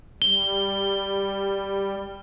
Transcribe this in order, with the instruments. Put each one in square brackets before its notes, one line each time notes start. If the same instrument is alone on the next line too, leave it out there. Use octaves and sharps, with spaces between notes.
[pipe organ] G3 [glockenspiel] G7